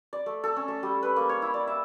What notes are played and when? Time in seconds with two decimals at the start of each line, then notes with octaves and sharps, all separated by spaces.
0.13 D5
0.26 A3
0.44 A4
0.56 C#4
0.68 A3
0.83 G3
1.03 B4
1.16 A#3
1.29 C#5
1.42 E4
1.54 D5
1.67 E5